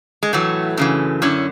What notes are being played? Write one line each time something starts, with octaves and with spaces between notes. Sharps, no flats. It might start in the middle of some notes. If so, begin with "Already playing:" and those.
G#3
A2 E3 F#3 A3
F#2 C#3 E3
F#2 D3 C#4 E4